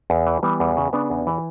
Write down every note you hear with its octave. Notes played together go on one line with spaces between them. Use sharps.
E2
E3
E3 G3 B3
E2
C#3
C#3 B3 D4
E2
E3